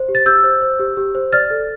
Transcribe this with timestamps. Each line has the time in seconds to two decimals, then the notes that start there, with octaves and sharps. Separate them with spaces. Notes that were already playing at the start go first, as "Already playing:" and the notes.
Already playing: C5
0.09 G4
0.15 A6
0.26 G4 E6 G6
0.44 C5
0.62 C5
0.79 G4
0.97 G4
1.15 C5
1.32 D5 F6 A6
1.50 A4